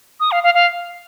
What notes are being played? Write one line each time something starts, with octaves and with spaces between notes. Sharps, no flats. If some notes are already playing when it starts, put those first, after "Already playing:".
D#6
F5
F5
F5